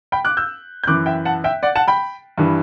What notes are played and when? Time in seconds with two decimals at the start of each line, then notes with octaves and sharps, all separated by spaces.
0.12 G5 B5
0.25 D6 F#6
0.37 E6 G6
0.84 G6
0.87 F#2 E3 D6 F#6
1.06 E5 G5
1.25 F#5 A5
1.44 E5 G5
1.63 D5 F#5
1.75 F#5 A5
1.88 G5 B5
2.38 G2 E3